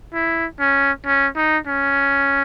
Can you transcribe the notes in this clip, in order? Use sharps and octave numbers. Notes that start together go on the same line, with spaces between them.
E4
C#4
C#4
D#4
C#4